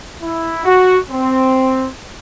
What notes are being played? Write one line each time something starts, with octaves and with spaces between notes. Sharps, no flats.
E4
F#4
C4